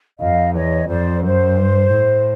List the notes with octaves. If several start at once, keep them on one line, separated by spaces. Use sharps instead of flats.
F2 D#5 F5
E2 C#5 D#5
F2 C5 D5
F#2 C5
G2
A2